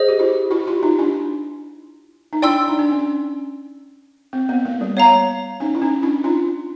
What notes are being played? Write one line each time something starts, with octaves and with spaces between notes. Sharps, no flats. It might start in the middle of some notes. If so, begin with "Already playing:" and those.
Already playing: G#4 C5 D#5
G4
E4 F#4
E4 F#4
F4 G4
D#4 F4
D4 E4
D#4
D4 E4 D5 G5 C6 E6
D#4
D4
C#4
C4
B3
A#3
G3
B3 C#5 F5 A#5
C#4 D#4
E4
C#4 D#4
D4 E4
D#4 F4